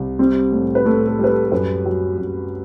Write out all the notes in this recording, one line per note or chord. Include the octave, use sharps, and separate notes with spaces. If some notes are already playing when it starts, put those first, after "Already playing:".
Already playing: C2
G3 C4
A2
B4
A2 A4
A4
G3
B4
A4
A4
F#2 B4
F#3
F#2